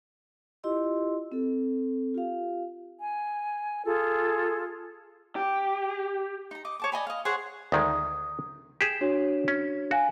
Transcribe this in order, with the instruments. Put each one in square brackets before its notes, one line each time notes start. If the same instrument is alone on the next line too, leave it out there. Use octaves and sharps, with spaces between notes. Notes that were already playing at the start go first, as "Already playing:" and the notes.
[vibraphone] E4 F4 G4 D#5 C6 E6
C4 A4
F4 G4 F5
[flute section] G#5
F4 G#4 A4
[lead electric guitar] G4
[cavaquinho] D#4 A#5
D#5 D6
C#5 A5 D6
D5 D#5 G#5 B5
D#5 F5
G#4 C5 C#5 F#5
[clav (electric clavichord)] D2 D#3 G#3 [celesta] D#6
[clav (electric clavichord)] G4 G#4 [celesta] E7
[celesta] D4 F#4 C#5
[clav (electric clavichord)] C#4
[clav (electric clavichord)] F#4 [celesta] F5 G#5